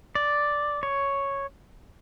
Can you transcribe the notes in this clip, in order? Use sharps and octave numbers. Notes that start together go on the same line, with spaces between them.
D5
C#5